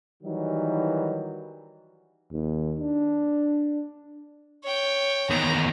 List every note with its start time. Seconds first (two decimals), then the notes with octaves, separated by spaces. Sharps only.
0.23 D#3 E3 F#3 G3 D#4
2.32 D#2
2.80 D4
4.64 C#5 G5
5.30 E2 D#3 A#5